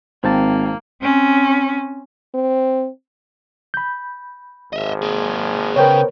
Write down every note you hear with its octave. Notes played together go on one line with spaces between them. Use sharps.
G#1 A#3 C4 G5 A5
C4 C#4
C4
B5 G6
G#1 D#5 E5
A#3 G#4
C#3 B3 A#4 C5 C#5 G5